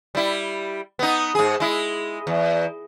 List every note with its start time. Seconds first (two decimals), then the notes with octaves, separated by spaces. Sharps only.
0.15 G3 E4
0.99 B3 D#4
1.35 G#2 G#4
1.60 G#3 E4
2.27 E2